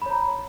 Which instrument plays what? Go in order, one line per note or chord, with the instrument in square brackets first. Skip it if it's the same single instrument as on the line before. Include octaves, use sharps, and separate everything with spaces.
[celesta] B5
C#5
A#5